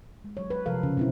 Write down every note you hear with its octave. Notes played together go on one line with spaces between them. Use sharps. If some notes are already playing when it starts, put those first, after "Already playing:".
G#3
F#3 C#5
B4
C3 F3 A4 A#4 F5
C#3
B2 C4 E4